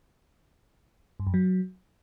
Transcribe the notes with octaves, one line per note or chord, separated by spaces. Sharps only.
G2
F#2
F#3